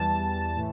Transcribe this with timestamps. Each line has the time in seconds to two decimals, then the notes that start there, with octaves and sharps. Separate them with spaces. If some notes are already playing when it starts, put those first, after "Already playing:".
Already playing: E2 E3 G3 A5
0.55 A2 E3 A3